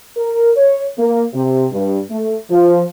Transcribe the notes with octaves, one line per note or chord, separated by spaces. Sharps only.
A#4
C#5
A#3
C3
G2
A3
F3